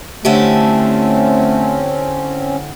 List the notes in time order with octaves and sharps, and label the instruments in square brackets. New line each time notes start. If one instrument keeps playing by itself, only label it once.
[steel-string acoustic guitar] D3 E4 G4 [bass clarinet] A3 [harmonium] C4 C#4